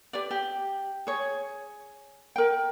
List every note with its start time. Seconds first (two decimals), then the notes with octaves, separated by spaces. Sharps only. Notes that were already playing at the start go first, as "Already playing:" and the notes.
0.13 G4 B4 D5
0.31 G4
1.07 G#4 C#5
2.36 A#4 G5